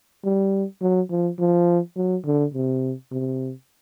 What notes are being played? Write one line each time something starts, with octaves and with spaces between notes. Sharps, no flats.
G3
F#3
F3
F3
F#3
D3
C3
C3